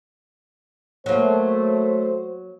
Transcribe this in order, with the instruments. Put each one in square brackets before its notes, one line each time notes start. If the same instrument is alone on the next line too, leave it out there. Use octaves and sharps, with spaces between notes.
[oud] F#3 A#3 [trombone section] A3 [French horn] C5